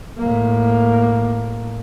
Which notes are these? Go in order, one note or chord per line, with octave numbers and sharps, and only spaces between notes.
A2 A#3